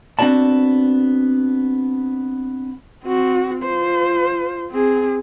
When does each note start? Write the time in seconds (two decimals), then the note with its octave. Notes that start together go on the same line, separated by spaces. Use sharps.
0.19 B3 C4 D4 F#4 D5 A5
3.04 C4 F#4
3.63 F4 C5
4.71 C4 G#4